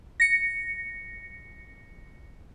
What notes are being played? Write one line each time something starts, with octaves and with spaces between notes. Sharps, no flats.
A#6 C#7